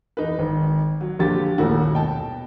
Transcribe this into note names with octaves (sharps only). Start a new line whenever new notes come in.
E2 D#4 B4
G#1
F#3
A#1 D3 G4 A6
D#1 G#1 A#2 A3 E4 F#4
B2 G5 A5